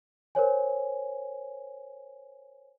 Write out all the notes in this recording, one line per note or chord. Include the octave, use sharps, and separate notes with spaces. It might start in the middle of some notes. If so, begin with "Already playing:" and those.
A#4 C5 C#5 G#5